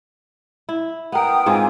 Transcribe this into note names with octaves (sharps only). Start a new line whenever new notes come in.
E4
B3 A#4 G5 D#6
G#2 C4 F4 G#5 D6